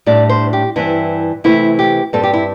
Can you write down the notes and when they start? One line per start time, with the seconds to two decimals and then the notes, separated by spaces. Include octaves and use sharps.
0.06 A2 G3 D4 D5
0.29 C5
0.53 G4
0.76 G2 E3 C4 E4
1.44 C3 E3 A3 C4 E4
1.79 G4
2.13 G2 G3 C4 A4
2.23 G4
2.33 E4